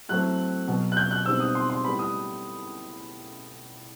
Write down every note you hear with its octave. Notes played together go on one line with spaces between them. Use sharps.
A2 F#3 A3 C4 F#6
B2 F#3 B3
F#6
G6
F#6
B2 G3 C4 D#4 E6
D#6
C6
C6
A2 G3 B3 B5
D#6